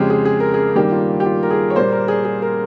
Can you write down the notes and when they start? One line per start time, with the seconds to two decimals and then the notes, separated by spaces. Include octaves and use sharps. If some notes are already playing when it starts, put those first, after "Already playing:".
Already playing: F2 C#3 G#3 C4 G4 G#4
0.10 G#4
0.25 G#4
0.40 A#4
0.54 G#4
0.75 G2 D#3 A#3 G4
0.92 F4
1.20 G4
1.26 F4
1.43 A#4
1.51 G#4
1.70 C#5
1.75 A#2 G3 A#3 C5
1.92 A#4
2.08 G#4
2.25 G#4
2.42 A#4